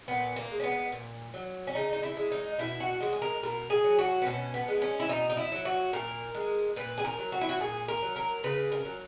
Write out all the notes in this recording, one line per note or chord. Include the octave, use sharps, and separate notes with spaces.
A#2 B3
A#3
G#3
C#4
B3
A#2
F#3
C#4
C#3 D#4
D#4
E4
G#3
D#4
B2 E4
F#4
G#3 F#4
G#4
A#4
B2 A#4
G#4
F#3
F#4
B3
B2 C#4
B3
G#3
C#4
E4
B2 D#4
D#4
E4
F#3
F#4
A#2 A#4
G#3
A#2 B4
G#4
A#4
F#3
F#4
E4
F#4
A#2 G#4
A#4
F#3
A#4
C#3 B4
A#4
F#3